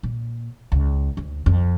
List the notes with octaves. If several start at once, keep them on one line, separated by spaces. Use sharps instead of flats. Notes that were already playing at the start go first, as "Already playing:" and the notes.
A#2
C#2
D2
F2